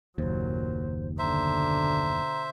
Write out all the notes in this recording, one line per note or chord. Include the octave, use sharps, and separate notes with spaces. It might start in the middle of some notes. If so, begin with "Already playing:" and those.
F#1 D#2 A#2 F#3 C5
B2 D3 C5 E5 A#5